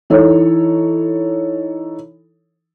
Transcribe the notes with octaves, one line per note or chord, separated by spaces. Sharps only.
E3 D#4 A4 C#5